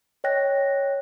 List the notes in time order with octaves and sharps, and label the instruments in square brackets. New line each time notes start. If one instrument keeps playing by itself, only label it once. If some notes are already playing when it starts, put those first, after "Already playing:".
[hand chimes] C#5 D#5 G5 F#6 A#6